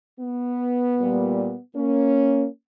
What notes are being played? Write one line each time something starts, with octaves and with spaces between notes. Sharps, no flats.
B3
A#2 G3
A#3 C#4